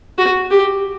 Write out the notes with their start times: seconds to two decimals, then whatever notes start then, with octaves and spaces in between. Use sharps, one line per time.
0.18 F#4
0.51 G4